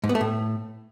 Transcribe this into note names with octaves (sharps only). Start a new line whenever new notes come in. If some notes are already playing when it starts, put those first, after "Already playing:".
G#2
B3
A3
A2